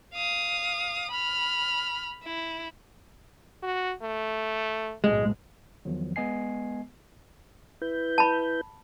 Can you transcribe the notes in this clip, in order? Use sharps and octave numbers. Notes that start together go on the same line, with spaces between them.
F5 D#6
B5 F6
E4
F#4
A3
F#1 B1 A2 G#3
E2 D#3 F3 F#3
G#3 B3 D#5 G#5 C7
E4 B4 G6
A5 B5